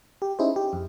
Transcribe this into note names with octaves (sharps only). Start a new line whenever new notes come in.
G4
C#4 D#4 E4 G#4 C5
G4
F2